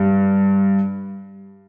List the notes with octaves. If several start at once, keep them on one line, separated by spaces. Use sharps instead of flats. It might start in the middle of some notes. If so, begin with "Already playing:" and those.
Already playing: G2